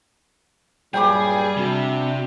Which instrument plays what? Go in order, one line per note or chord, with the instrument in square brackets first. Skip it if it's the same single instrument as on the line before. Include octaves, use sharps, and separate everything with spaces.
[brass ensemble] G2 A#2 F#3 [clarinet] G3 [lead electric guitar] G#4 [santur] G5 B5 D6
[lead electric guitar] C3 [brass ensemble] D4 F#4